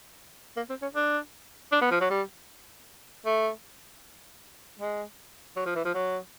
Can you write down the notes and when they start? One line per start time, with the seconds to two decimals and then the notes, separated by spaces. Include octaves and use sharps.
0.57 A#3
0.69 C4
0.82 C#4
0.95 D4
1.72 D4
1.81 B3
1.91 F3
2.01 F#3
2.10 G3
3.26 A3
4.80 G#3
5.56 F#3
5.66 F3
5.76 E3
5.85 F3
5.94 F#3